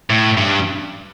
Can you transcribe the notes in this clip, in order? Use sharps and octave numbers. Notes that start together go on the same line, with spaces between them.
A2
G2